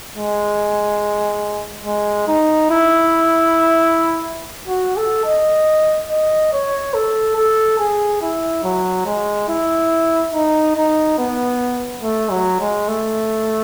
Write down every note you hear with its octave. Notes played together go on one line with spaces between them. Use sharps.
G#3
G#3
D#4
E4
F#4
A4
D#5
D#5
C#5
A4
A4
G#4
E4
F#3
G#3
E4
D#4
D#4
B3
A3
F#3
G#3
A3